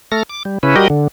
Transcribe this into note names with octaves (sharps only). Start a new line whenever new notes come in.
A3 A4 F6 A#6
D6
G3
C#3 C#4 E4 B4
G3 F#4 G4 A#4 D#5
D3